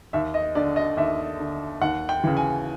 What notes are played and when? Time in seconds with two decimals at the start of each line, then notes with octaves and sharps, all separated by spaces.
0.13 D#2 E5
0.34 D#5
0.55 D3 D5
0.76 D#5
0.97 D#2 E5
1.39 D3
1.81 D#2 F#5
2.09 G5
2.24 C#3 E3
2.37 G#5